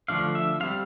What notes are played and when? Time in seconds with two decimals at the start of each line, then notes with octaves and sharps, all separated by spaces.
0.08 D3 F3 A3 D4 F5
0.35 E5
0.60 G3 C4 F5